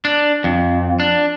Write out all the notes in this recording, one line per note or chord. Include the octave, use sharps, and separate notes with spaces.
D4
F2
D4